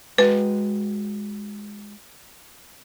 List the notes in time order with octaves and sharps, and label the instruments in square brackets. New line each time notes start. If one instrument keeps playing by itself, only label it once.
[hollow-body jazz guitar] G#3 F#4 D#5 [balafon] B4